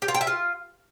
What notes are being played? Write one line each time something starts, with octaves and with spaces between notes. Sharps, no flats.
G4
F4
G5
E5
F4